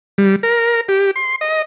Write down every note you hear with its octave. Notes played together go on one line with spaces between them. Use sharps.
G3
A#4
G4
C6
D#5